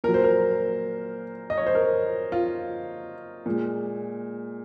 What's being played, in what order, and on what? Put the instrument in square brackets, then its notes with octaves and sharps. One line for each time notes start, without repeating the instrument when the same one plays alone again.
[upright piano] A#2 F#3 A#4
C5
A#4
D#5
C#5
C5
A#4
F4
A#2 G#3